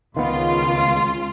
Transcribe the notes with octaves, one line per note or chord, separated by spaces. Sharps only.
C#2 D#3 B3 F4 F5 C6